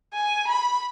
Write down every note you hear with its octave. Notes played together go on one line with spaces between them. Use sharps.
G#5
B5